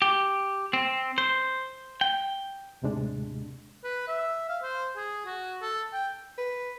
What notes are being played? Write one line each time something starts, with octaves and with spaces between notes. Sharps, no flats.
G4
C4
C5
G5
D#2 A2 C3 G#3 D4
B4
E5
F5
C5
G#4
F#4
A4
G5
B4